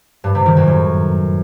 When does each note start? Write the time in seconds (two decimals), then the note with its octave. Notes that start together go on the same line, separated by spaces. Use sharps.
0.24 G2
0.35 C3
0.46 D#3
0.57 F#2
0.68 A2